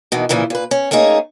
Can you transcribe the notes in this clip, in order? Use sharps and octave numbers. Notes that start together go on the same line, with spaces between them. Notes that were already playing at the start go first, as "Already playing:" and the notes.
B2 D#3 E3
A#2 C#3 E3 F3 E4
A#2 B4
C#4
A3 A#3 C#4 D#4 G#4